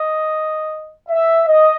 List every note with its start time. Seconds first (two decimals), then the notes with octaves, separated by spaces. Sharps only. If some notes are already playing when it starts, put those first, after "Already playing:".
Already playing: D#5
1.08 E5
1.48 D#5